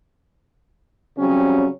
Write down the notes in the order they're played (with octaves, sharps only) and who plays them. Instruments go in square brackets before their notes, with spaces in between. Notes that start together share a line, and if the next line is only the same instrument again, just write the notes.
[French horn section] C#3 F#3 G3 C4 C#4